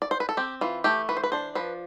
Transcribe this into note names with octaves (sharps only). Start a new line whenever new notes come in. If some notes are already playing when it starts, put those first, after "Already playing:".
D5
C5
B4
A4
C4 G4
E3 F4
A3 G4
E3 B4
C5
B4
D4 C5
F3 B4